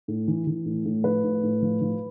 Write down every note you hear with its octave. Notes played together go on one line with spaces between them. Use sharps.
A2
E3
E3
A2
A2
F3 B4
A2
A2
F3
F3